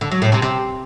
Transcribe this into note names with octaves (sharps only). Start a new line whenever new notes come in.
D3
F#3
A2
C3
C3